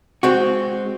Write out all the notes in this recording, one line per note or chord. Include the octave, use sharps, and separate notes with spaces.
G#3 C4 F#4